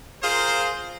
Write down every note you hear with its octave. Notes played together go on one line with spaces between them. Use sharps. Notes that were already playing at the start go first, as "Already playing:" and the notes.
F4 G#4 A#4 C5